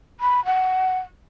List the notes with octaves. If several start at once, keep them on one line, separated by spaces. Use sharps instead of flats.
B5
F#5